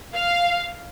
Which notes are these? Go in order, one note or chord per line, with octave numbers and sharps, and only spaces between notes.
F5